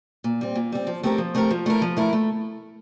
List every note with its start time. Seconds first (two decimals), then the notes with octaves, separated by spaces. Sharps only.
0.24 A#2
0.41 G3 C4
0.56 A#2
0.72 G3 C4
0.87 F3
1.03 A3 C4 G4 A#4
1.18 F3
1.35 A3 C4 G4 A#4
1.51 F3
1.66 A3 E4 A#4
1.82 F3
1.97 A3 E4 A#4
2.13 A3